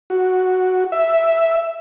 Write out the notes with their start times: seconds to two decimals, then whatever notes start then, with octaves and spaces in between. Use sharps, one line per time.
0.10 F#4
0.92 E5